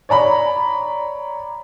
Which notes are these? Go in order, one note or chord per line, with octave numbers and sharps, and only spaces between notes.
C#5 D5 A#5 B5